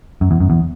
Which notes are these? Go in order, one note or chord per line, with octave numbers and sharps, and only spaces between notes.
F#2
E2
F#2
E2